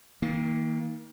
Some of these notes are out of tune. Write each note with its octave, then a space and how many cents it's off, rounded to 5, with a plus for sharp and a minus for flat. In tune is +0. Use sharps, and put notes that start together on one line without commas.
D#3 +35 A#3 +0